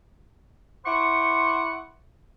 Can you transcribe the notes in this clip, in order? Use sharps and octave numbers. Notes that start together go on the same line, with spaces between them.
E4 C5 F#5 C#6 D6